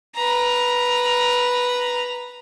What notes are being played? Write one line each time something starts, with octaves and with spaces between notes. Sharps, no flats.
B4 A#5